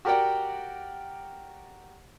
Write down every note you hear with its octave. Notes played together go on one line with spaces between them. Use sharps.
F#4 G4 A#4 D5 F#5 G5